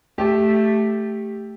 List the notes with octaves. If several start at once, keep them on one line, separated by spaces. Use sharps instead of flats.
A3 G4